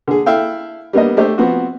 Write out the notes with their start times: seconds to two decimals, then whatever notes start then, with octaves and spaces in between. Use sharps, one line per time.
0.08 D3 G#4
0.26 E4 A4 E5 F5 G5
0.93 G3 A#3 B3 D4 D#5
1.17 A3 D4 G4 C5 D#5
1.38 F3 B3 C4 F#4